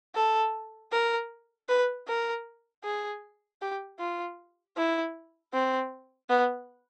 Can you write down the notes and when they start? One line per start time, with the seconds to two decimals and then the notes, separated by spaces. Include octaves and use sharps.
0.15 A4
0.92 A#4
1.69 B4
2.08 A#4
2.84 G#4
3.62 G4
3.99 F4
4.77 E4
5.53 C4
6.29 B3